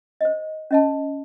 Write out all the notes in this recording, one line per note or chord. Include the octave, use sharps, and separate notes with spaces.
C5 D#5
C#4 D#5 A5